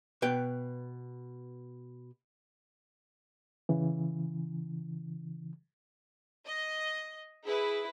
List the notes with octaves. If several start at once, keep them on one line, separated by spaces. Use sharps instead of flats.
B2 B4 G5
C#3 E3
D#5
E4 G#4 B4